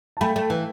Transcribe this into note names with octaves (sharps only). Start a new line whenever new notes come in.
A5
A3 G5 B5
A3
E3